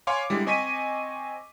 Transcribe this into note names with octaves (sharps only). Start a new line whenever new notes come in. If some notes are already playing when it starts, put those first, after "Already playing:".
C#5 F5 G#5 C6 D6
D3 G3 G#3 E4
C4 D#5 G#5 C#6 B6 D#7